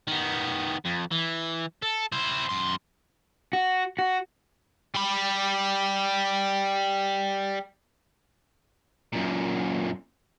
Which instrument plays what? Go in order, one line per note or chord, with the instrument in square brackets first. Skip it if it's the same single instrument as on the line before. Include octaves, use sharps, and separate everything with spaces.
[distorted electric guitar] D#3 B3
F2
E3
A4
E4 C5
F#2 C6
[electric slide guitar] F#4
F#4
[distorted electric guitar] G3 B5
F#2 A#2